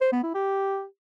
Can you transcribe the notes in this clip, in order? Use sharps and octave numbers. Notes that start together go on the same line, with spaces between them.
C5
B3
E4
G4